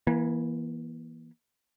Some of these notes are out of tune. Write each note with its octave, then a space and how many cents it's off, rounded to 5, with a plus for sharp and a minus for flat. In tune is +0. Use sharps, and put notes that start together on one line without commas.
E3 +0 A#3 +35